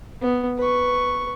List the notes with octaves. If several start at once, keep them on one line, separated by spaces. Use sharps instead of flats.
B3
B4 C#6